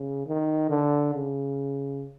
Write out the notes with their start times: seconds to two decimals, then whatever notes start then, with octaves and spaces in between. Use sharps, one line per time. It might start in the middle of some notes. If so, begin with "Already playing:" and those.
Already playing: C#3
0.27 D#3
0.70 D3
1.14 C#3